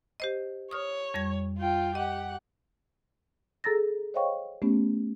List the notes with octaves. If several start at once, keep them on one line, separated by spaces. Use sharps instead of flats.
G4 C5 D#5
C#5 D#6 F6
F2 G3 G#6
F4 G5
G4 D#5 F#5
G#4 A4 A#5 E6 A6 A#6
C5 C#5 D#5 F5 G5 C#6
A3 B3 C#4 G4